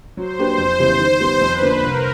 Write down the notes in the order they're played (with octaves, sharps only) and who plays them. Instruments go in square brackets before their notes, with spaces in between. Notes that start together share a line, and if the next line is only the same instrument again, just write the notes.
[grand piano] F#3 [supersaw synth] C5
[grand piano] A#3 D4 G4 B4
F2
C#3 E3 G3 B3
D#3
G3 B3
[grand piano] F2 [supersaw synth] B4
[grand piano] D3 F3 A#3 D4
[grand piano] C2 [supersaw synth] A#4